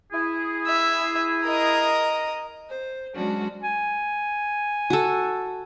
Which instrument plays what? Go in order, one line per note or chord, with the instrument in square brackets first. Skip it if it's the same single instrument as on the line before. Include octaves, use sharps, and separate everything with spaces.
[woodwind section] E4 G#4
[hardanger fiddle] E5
A#4 D#5
[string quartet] C5
F#3 G#3 C#4 D4 F#4
[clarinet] G#5
[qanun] F#4 A4